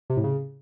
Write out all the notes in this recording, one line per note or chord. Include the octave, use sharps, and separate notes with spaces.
C3
A2
C#3